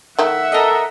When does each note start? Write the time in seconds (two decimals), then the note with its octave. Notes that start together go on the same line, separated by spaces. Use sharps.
0.19 D#3 A3 E5 F#5
0.52 A4 A#4 D#5